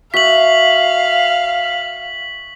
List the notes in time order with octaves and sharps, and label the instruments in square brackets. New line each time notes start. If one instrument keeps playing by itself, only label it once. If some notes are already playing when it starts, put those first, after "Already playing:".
[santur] F#4 E5 [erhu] F5 [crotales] B6 F#7